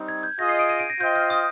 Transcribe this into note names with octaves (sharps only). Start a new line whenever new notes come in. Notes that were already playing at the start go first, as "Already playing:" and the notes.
Already playing: G3 C4 D#4
G#6
G6
F4 G#4 D#5 A#6
C7
D7
D#7
D7
A#6
F4 C5 D#5 G5 G6
F6
D#6